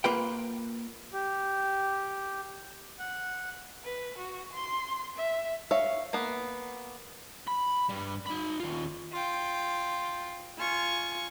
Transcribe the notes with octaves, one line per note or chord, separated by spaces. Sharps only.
A#3 F4 B4 G5
G4
F#5
B4
F#4
C6
E5
C#5 E5 F5
A#3 B3
B5
G2 G3
D#4 B5
D#2 F4
F4 G5
F4 G#5 C#6